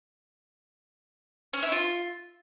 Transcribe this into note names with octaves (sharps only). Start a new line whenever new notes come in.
C#4
E4
F4